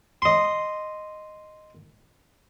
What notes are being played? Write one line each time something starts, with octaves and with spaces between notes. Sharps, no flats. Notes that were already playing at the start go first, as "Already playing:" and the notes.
D#5 C6